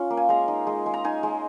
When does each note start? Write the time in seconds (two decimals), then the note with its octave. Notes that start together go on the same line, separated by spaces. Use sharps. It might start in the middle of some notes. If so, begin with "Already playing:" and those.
Already playing: C#4 F4
0.10 A#3
0.17 G#5
0.29 G#3 A#5
0.48 D#4
0.67 G#3
0.86 G#3
0.94 A#5
1.04 D#4 G#5
1.23 G#3